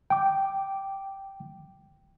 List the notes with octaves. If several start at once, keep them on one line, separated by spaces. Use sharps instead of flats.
G5 D6